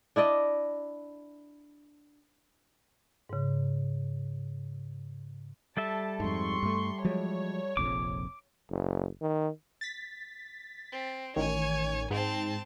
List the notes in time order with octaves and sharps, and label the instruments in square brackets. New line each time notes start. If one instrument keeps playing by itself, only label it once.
[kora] D4 E4 D5 D#5
[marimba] G#2 C#3
[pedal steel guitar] G3 A4 E5 [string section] A5
[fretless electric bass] F2 G#2 [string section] C6 C#6
[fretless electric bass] G2 A3
[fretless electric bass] F3 F#3 G#3 [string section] C#5
[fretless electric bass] F1 A#1 F2 [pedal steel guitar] D6
[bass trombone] F#1
D#3
[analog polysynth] A6 B6
[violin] C4
[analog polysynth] A1 D#3 [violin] C#5 G#5
[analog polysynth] G#2 [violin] C4 A5